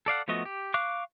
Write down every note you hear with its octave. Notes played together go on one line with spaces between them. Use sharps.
A4 D5 F5 F#5
F3 A3 B3 F#4 D#5
G4
F5 C#6 D6 F#6